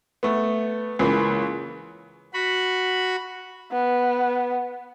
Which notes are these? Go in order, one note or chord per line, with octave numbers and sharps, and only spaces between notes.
A3 B3
C#2 E3 A#3
F#4 B5
B3